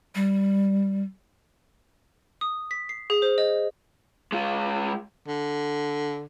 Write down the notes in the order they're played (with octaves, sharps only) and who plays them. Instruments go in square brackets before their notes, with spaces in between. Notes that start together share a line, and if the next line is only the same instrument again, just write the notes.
[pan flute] G3
[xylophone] D#6
B6
C7
G#4
C5
D#5
[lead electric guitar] G#3 F4
[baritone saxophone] D3